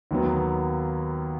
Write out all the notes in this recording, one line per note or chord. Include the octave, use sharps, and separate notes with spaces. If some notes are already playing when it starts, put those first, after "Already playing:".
D#2 D#3 F#3 B3